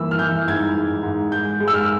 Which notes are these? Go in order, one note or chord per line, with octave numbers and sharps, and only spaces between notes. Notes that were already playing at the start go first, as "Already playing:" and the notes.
Already playing: E3 A#3 E6
F6
E3 G6
G#2 G#6
G#2
G#2
G#3 G6
G#3
E6
F6